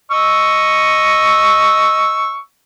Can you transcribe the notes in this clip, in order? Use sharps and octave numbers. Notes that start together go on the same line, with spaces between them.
D#5 C#6 E6